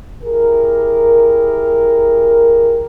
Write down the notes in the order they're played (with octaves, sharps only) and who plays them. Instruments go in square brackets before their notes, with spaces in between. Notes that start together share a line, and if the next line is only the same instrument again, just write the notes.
[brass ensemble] E4 G4 G#4 A#4